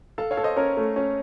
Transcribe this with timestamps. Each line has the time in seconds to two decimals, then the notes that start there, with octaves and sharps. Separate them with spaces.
0.18 A4 F5 A5
0.31 C#5 F5
0.37 A4
0.43 C5 D#5
0.56 C#4 A#4 C#5
0.77 A3
0.96 C#4